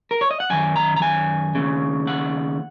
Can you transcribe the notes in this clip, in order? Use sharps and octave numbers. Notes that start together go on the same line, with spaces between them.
A#4
C#5
D#5
F#5
F#2 D#3 G#5
A#5
A#5
G#5
D#2 C#3
F#5